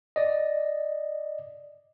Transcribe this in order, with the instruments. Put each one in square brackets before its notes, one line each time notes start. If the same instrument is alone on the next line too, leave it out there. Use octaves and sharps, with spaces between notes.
[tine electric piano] D5 D#5